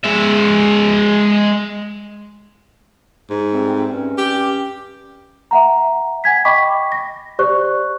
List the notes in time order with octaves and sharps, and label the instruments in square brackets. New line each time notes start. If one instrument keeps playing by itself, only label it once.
[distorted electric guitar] G#3 E5
[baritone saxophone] G#2
[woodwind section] G3 A3 C4
G2 C#4
[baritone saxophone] G4
[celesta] E5 F#5 A#5
F#5 G#5 G#6 B6
D#5 G5 B5 C#6 D6 B6
A#6
G4 C5 D5 C#6 F#6